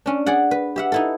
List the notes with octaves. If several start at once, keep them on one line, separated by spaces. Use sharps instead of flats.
C#4 D4
G#4 D5 F#5
B4
G4 E5 F#5
D#4 E4 A4